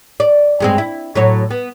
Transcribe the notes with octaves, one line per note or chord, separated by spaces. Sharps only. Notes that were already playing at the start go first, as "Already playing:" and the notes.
D5
G2 G#3 C4
E4
A2 F#3 C#5
B3